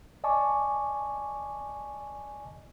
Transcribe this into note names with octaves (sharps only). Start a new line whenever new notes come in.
D5 D#5 G#5 A5 C#6 D6